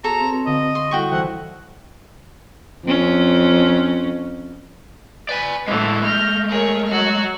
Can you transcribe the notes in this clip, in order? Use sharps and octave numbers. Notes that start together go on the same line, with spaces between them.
B3 F#4 G#4 A4 C#5 A#5
C4 F#4 B4
D3 D#5 F5
C6 C#6
G3 E4 F#4 A4 G5 C#6
C2 E3 E5 F#5
F2 C#4
B4 D5 G#5
A2 D3 E3 G#3 A3
F6 G6 A#6
G#4 A#4 C#5
F#3 F#4 F6